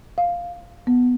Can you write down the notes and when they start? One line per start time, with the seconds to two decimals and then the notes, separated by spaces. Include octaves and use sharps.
0.18 F5
0.87 B3